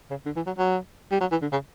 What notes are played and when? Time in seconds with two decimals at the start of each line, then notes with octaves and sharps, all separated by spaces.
0.10 C#3
0.26 D3
0.36 E3
0.47 F#3
0.58 F#3
1.11 G3
1.21 F#3
1.32 E3
1.42 D3
1.52 C#3